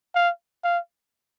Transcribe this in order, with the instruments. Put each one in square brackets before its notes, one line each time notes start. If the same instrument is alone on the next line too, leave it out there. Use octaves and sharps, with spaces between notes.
[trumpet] F5
F5